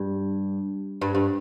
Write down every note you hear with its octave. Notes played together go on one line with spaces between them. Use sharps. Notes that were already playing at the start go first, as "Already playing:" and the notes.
Already playing: G2
G2
G2